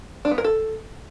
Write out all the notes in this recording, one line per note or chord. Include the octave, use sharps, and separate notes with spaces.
D4
B3
A#4
A4